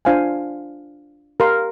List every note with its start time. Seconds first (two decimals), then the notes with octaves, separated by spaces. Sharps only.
0.05 D4 F4 C5 F5 G#5
1.40 G4 A#4 F5 C6